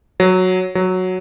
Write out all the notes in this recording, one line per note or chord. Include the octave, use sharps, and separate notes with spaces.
F#3
F#3